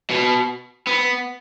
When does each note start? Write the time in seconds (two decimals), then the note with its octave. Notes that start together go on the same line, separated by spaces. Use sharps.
0.10 B2
0.87 B3